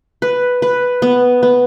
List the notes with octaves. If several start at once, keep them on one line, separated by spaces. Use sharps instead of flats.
B4
B4
B3
B3